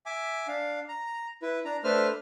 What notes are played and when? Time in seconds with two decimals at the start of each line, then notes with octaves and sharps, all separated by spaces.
0.06 E5 G#5 D6
0.48 D4 F5
0.88 A#5
1.42 E4 B4
1.65 D4 A#5
1.84 A3 D4 B4 C5 F6